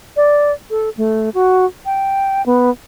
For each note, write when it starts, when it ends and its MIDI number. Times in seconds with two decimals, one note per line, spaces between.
0.17 0.52 74
0.70 0.89 69
0.97 1.30 57
1.34 1.65 66
1.86 2.44 79
2.46 2.70 59